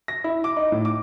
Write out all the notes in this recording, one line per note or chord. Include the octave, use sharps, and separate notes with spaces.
A#6
E4
D6
D#4
A2
D6